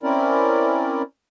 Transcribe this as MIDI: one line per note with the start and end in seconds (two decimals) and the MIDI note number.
0.03 1.02 60
0.03 1.02 61
0.03 1.02 64
0.03 1.02 70
0.03 1.02 74